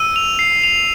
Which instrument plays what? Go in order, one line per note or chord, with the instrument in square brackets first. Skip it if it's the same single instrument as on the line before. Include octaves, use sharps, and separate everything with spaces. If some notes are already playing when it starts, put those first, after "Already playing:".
Already playing: [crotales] E6 D#7
F7
C7
F7